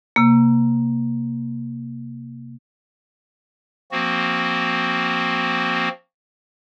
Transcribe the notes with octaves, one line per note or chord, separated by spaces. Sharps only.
C3 A#3
F3 A#3 C4 F#4